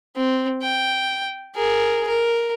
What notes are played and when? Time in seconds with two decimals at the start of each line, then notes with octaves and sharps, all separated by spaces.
0.17 C4
0.63 G5
1.56 G#4 A#4
2.08 A#4